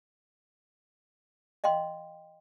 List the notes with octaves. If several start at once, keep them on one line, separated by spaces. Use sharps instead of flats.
D#5 F5 G5 C6